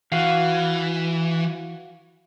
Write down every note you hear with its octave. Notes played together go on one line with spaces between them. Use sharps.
E3 F#4 F5